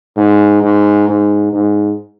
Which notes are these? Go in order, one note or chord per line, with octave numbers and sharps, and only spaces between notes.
G#2
G#2
G#2
G#2